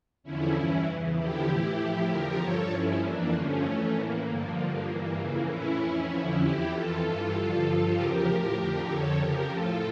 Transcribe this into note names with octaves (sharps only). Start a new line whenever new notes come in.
E2 D3 F3 C#4 E4
G2 E3 C#4 E4
E2 C#3 E3
E2 D3 F3 E4 G4
A2 E3
A2 F3
E2 D3 F3 G4 A#4
G2 F3 A4 C#5
G2 F3 C#4 E4
F2 E3 A#3 D4
G2 D3 F3 A3 C#4
F2 E3
A2 E3 A#3
G2 D3 F3
G2 D3 F3
G2 E3 A#3
F2 C#3 E3 A#3
A2 E3 C#4 E4
F2 E3 C#4 E4
F2 D3 F3
E2 E3 E4 G4
F2 E3 F4 A4
G2 E3 F4 A4
G2 D3 F3
G2 F3
E2 C#3 F3 G4 A#4
A2 F3
F2 D3 F3
F2 D3 F3 A4 C#5
F2 C#3 F3 G4 A#4
A2 F3 F4 A4